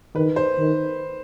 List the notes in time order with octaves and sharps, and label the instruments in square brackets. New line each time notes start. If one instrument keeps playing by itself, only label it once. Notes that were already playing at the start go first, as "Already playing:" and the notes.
[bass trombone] D#3 [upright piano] B4
[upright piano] C5
[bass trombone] D#3